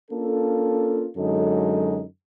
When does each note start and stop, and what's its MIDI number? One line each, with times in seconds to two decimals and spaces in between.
0.11 1.07 58
0.11 1.07 61
0.11 1.07 62
0.11 1.07 65
0.11 1.07 69
1.16 2.03 42
1.16 2.03 50
1.16 2.03 54
1.16 2.03 56
1.16 2.03 63
1.16 2.03 69